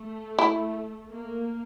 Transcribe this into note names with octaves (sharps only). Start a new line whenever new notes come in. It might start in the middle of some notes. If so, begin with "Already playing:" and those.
Already playing: A3
E4
A#3